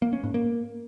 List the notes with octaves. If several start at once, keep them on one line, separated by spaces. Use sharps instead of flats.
A#3
C#4
G#2
A#3